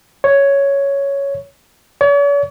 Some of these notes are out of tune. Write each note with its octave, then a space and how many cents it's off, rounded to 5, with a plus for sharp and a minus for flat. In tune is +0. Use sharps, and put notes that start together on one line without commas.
C#5 +5
C#5 +45